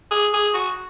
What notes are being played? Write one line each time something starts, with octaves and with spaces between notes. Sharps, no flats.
G#4
G#4
F#4